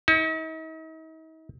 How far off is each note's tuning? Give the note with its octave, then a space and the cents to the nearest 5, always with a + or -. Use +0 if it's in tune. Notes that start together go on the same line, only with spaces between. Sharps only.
D#4 +45